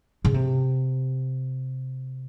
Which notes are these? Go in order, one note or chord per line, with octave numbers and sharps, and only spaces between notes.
C#3
C3